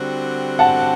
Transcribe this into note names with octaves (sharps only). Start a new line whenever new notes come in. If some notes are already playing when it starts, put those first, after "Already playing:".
Already playing: D3 G3 C4 F#4
F#5 A5